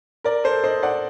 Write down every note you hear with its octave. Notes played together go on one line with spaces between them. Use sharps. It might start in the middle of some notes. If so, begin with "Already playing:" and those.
A#4 D5
A4 C5
C5 D#5
D5 F#5